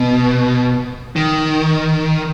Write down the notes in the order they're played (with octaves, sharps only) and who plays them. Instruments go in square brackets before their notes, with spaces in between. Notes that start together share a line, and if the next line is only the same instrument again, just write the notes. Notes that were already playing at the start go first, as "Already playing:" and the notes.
Already playing: [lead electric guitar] B2
D#3